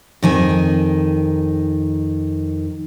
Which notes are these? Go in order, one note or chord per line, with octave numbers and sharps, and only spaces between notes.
F2 D#3 G#5